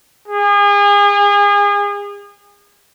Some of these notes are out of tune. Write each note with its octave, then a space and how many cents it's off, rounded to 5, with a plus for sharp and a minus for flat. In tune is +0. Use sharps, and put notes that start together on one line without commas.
G#4 -35